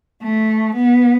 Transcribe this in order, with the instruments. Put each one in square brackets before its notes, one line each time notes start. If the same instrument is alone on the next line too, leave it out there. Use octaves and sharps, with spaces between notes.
[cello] A3
B3